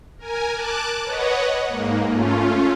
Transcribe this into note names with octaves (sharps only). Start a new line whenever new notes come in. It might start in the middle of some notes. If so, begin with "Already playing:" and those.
A#4 G#5
A5 D6 F#6
B4 C#5 D#5 F#5
G#2 A#3
A3 C#4 F4